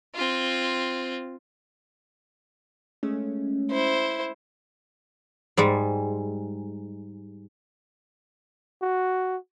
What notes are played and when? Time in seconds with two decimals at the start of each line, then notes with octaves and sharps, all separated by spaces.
0.15 C4 F4
3.03 G#3 A3 C#4
3.71 E4 C5
5.57 G#2 G3 G#3
8.82 F#4